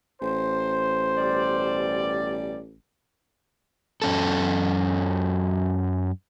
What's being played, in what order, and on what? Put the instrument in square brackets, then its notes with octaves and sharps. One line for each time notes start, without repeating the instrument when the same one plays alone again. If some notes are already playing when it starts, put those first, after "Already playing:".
[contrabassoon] A1 [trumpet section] C5
[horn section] B2 G3 D5
[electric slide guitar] F#2 C#4 A4